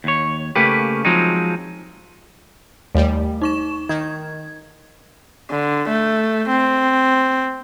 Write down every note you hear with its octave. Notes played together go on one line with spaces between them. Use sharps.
D#2 C#5
C#3 A3 A#3 C#4 G4 B4
F3 F#3 G#3 C4 D#4
D#2 G3 A3
D#4 C#6 E7
D#3 G#6
D3
A3
C4